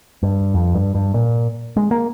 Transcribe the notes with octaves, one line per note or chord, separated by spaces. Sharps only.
G2
F2
G2
G2
A#2
G#3
A#3